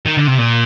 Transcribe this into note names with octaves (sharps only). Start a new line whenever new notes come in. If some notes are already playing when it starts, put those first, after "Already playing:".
D#3
D3
C3
A#2